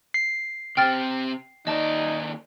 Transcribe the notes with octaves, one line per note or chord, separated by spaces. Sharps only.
C7
C3 C4 G5 F6 A6
D#2 D#4 D5 D#5 A5